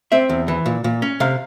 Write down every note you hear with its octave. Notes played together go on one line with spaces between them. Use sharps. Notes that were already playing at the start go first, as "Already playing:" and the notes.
C4 E5
E2
E3
A#2
A#2
C#4
C3 F5